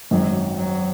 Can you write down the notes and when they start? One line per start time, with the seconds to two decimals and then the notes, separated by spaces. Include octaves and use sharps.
0.11 G#1 F#2 D#3 F#3
0.58 F#3